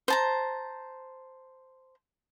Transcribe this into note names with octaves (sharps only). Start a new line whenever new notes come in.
C5 A5 A#5